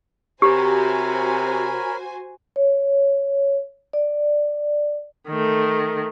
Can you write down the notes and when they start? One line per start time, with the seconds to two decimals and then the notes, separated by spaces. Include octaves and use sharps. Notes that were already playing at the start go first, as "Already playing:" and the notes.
0.42 C3 F#4 G4 A#4 C5 C#5 G#5 B5
2.56 C#5
3.93 D5
5.28 D#3 A3